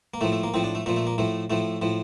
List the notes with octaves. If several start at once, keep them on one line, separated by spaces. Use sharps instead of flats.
A#3
A2 F3 A3
A3
A#3
A2 F3 C4
D4
A3
A#2 F3 A3
A3
A#3
A2 F3 A3
A2 F3 A3
A2 F3